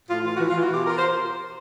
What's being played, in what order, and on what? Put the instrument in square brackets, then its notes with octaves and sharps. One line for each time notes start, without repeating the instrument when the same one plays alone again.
[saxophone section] A2 F4
E3 F4
F#4
E3
F4
E3 F#4
B2 G4
F4 A#4
C5